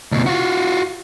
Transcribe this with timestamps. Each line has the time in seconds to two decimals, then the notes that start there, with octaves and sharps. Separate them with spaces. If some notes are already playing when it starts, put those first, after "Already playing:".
0.12 D2 B2
0.26 F4 F#4